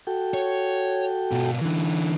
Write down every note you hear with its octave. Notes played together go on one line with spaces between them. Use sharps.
F#4 A4 G5
C#5
B2 F4
D3 E3